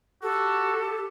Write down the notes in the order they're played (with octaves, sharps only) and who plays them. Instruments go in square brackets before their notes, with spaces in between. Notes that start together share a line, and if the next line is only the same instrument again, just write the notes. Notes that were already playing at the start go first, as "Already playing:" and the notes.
[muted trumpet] F#4 [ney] G4 [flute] A4